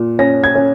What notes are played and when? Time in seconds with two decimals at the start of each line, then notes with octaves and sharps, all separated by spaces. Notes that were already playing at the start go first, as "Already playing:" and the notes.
Already playing: A#2
0.19 C#4 A#6
0.44 G#6
0.55 C#4